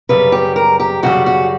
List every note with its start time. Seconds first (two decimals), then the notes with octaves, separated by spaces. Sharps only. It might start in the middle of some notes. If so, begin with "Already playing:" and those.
0.09 F#2 C#3 G3 B4
0.32 G4
0.56 A#4
0.80 G4
1.03 F#2 C#3 G3 F#4
1.26 F#4